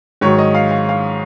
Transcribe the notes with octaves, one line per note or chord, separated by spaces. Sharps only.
G#2 D#3 F#3 C#5
D#5
F5
F5
F5